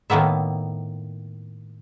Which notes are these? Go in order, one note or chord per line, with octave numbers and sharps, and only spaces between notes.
A2 D#3 A#3 B3 E5